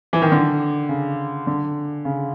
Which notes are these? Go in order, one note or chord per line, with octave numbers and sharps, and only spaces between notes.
E3
D#3
D3
C#3
D3
C#3